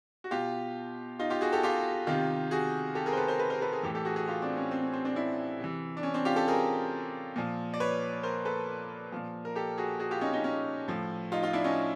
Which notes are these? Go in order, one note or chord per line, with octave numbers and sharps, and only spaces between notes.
F#4
B2 F4 G4
D#4 F4
F4 G4
F#4 G#4
G4 A4
F4 G4
C3 D#3 F4 G4
F#4 G#4
G4 A4
G#4 A#4
C5
A4 B4
A#4 C5
A4 B4
A#4 C5
A4 B4
G#4 A#4
A2 E3 G4 A4
G4 A4
F#4 G#4
F#4 G#4
F4 G4
C4 D4
C#4
C4
C#4
C4
C4 D4
D4 E4
C3 E3
D4
C#4
C4 D4
F4 G4
G4 A4
G#4 A#4
A#2 F3
D5
B4 C#5
A#4 C5
A4 B4
A#2 F3
A#4
G4 A4
F#4 G#4
F#4 G#4
F4 G4
C#4 D#4
C#4 D#4
C#4 D#4
A2 F3
D#4 F4
D#4 F4
D4 E4
C#4 D#4